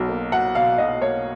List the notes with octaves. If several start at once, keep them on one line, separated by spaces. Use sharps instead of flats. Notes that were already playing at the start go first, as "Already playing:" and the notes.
Already playing: B1 B2 F#3
A#3
F#3 F#5
B2 F5
B1 D#5
A#3 C#5